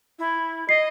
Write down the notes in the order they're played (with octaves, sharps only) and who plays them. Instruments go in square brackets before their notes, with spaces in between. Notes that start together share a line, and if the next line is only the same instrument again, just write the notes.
[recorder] E4
[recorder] D#5 [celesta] C7